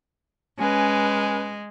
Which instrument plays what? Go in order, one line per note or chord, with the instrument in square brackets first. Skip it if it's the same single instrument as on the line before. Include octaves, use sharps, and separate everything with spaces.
[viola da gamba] G#3 [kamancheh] C#4 B4